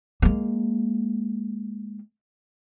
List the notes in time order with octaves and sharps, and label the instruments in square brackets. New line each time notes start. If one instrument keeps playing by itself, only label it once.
[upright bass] G#3 A#3